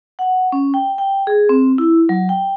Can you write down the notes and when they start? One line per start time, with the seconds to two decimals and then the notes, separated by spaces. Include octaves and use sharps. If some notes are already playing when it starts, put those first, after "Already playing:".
0.19 F#5
0.52 C#4
0.74 G5
0.98 G5
1.27 G#4
1.49 C4
1.78 E4
2.09 F#3
2.29 G5